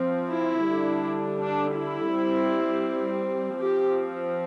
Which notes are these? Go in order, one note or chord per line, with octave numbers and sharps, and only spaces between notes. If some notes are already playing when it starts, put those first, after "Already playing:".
Already playing: F3 C4
E4
D3 G3 D4
D4
E4
G3 C4
F3 C4 G4